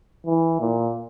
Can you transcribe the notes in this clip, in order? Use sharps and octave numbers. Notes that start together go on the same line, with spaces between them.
E3
A#2